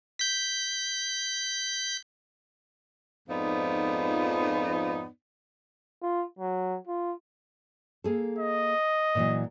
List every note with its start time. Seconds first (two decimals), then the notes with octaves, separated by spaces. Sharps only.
0.19 G6 B6
3.29 F2 G#2 F3 B3 D#4 D5
6.02 F4
6.39 F#3
6.87 F4
8.04 A#3 G#4 A4
8.39 D#5
9.15 A#2 E3 F#3